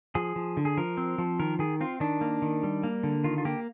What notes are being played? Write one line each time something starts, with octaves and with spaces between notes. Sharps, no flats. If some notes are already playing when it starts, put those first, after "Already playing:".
F3 G#4
F3
D3
G#4
F3 A#4
C4
F3
D#3 A#4
D#3 G#4
C4 F4
D#3 D4
A#3
D#3
G3
A#3
D3
D#3 F4
F4
A#3 G4